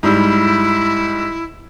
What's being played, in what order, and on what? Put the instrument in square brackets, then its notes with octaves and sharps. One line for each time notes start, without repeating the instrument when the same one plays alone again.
[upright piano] G#2 G3 [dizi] E4